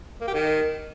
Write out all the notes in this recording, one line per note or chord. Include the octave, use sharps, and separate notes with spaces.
A#3
G4
D#3